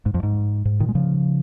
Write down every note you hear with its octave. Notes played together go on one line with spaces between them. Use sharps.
G#2
F2
G#2
G#2
A#2 D#3
G#3
C#3 F3